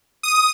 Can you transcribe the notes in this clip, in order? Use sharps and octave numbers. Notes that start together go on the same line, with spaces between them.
D#6